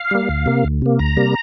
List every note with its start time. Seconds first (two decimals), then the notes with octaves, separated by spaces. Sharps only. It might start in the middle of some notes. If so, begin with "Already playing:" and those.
Already playing: F5
0.11 G3 A#3
0.29 D2
0.46 C3 A#3
0.64 D2
0.82 C3 A#3
0.99 D2 A#5
1.17 C3 G3 A#3